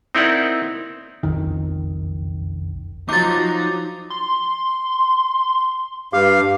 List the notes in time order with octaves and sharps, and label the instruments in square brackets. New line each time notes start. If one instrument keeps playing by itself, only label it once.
[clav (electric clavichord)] C4 D#4 E4 A#4 D5 F#5
[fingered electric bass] F#1 B1 F2 D#3
[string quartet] F3 F#3 [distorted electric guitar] D#4 [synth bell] D6 A6
[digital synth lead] C6
[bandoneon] G2 F5 [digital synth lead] G4